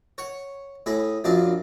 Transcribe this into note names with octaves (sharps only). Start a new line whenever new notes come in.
C#5 F#5
A2 G#4 B5
A#1 F#2 D4 F4 A5